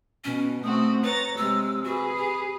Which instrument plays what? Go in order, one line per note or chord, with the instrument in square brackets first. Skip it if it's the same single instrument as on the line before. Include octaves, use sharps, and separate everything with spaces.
[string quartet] B2 [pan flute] C#4
[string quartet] A3 C4 F#4 [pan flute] D#6
[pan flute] B4 [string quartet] C#5 A#5 A6
[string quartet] C3 G#3 [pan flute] E6
[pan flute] F#4 [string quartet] G#4 B4
[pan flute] G4